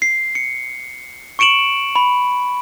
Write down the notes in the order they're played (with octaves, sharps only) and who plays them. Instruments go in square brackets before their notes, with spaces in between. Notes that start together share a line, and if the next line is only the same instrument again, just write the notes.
[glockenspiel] C7
C#7
C#6 C#7 D7 E7 F#7
B5